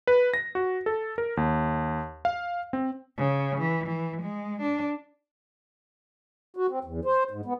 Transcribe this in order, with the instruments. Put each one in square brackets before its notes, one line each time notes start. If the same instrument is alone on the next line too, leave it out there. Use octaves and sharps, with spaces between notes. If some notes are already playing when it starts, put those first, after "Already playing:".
[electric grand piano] B4
A#6
F#4
A4
A#4
D#2
F5
C4
[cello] C#3
E3
E3
G#3
D4
[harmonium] F#4
C4
E2
C5
G#2
B3